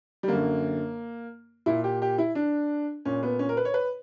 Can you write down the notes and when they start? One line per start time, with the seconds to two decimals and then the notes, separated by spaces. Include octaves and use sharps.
0.23 G3
0.28 F#2 D3 A#3
1.66 A#2 E4
1.84 G4
2.02 G4
2.18 E4
2.35 D4
3.05 A#2 C#4
3.23 B3
3.39 C#4
3.49 A#4
3.57 B4
3.65 C#5
3.74 B4